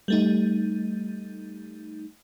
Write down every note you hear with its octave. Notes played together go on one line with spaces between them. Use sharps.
G3 A3 D#4